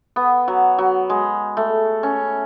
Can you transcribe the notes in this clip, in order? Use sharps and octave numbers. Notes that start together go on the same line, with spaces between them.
B3
F#3
F#3
G#3
A3
C#4